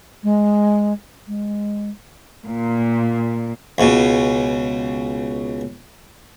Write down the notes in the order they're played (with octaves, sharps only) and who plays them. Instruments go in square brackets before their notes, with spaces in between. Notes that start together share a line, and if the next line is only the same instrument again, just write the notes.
[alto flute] G#3
G#3
[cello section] A#2
[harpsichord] C#2 B2